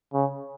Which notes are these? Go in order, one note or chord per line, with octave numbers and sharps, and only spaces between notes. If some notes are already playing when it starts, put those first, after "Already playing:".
C#3